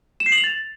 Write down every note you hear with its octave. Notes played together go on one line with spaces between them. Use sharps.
E7
C7
F#7
F7
A6